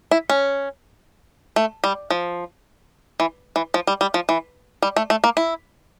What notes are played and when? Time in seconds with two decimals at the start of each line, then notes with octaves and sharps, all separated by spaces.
0.11 E4
0.30 C#4
1.56 A3
1.84 G3
2.10 F3
3.20 E3
3.56 E3
3.74 F3
3.87 G3
4.01 G3
4.14 F3
4.29 E3
4.82 G3
4.96 A3
5.10 A3
5.24 A#3
5.37 E4